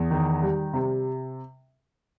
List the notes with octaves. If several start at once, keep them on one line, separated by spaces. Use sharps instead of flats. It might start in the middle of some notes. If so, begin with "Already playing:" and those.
Already playing: E2
D#3
G3
C3